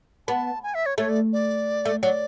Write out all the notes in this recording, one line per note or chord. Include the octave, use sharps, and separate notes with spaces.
B3 A5
G#5
E5
C#5
A3 C#5
D5
D5
A3
F#3 D5